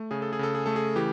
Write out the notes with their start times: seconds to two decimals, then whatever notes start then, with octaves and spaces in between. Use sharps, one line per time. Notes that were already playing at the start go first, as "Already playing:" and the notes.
Already playing: A3
0.11 C#3 G#4
0.22 A4
0.33 G#4
0.39 C#3 A4
0.55 G#4
0.66 A3 A4
0.76 G#4
0.96 E3 G4